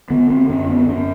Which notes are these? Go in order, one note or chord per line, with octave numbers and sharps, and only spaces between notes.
D3 B3
C4
F#2 C#4
B3
F#2 C#4